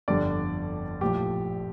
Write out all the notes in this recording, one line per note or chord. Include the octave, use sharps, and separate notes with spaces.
G1 F2 D3 G3 D5
A#1 A2 F3 G4